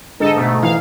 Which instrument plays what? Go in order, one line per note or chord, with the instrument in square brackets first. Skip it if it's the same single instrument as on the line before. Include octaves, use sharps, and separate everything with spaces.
[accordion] G#2 D#4 [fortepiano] D3 G#3 [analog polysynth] A4 D#5
[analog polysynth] B2 A3
[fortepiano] E3 [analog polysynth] F5